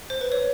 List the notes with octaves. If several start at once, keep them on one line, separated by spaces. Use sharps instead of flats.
C5
B4
C#5